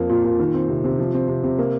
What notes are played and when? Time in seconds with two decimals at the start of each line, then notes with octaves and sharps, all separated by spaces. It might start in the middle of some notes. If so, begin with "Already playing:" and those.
Already playing: F2 F3 A#3
0.10 A#2
0.25 A#2
0.39 D#3
0.54 C4
0.68 C3
0.84 C3
0.99 F3
1.14 C4
1.28 C3
1.44 C3
1.59 A#3